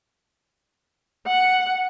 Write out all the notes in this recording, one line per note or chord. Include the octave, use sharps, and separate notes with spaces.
F#5